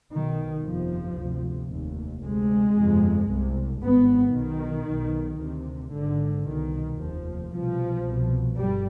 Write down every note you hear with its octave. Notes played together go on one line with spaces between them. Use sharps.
B1 B2 D#3
G1 F2 C3 F3
D2 C3
F1 D#2
D2 C3 G#3
G1 F2 C3
C2 C3
G#1 G2 B3
B1 B2 D#3
B1 B2
D2 C3
G#1 G#2 D3
C2 B2 D#3
F1 D#2 F3
C2 B2 F3
C2 B2
G1 G3